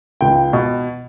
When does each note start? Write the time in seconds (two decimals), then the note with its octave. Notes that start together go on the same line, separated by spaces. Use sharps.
0.21 C#2 G5
0.53 B2